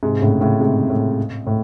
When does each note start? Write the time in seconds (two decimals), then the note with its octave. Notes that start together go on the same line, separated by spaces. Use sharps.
0.03 G#2 C3
0.22 A2 C#3
0.41 A2 C#3
0.60 G#2 C3
0.90 A2
1.47 A2